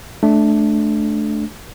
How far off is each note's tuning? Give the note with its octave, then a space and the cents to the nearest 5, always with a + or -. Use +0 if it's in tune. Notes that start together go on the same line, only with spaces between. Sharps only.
A3 -20 D4 +0